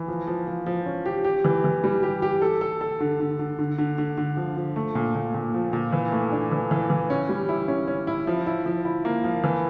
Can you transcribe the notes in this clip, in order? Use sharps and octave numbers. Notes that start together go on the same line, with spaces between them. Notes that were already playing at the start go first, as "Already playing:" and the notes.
Already playing: E3
F3
F3
F3
F3
C#4
G4
G4
E3
E3
G3
G4
G4
A4
A4
A4
D3
D3
D3
D3
D3
D3
D3
F3
F3
A3
A#2
A#2
A#2
F3
A#2
E3
A3
D4
E3
E3
E3
C#4
G3
E4
C#4
C#4
E4
F3
E4
F3
E4
A#3
F3
E3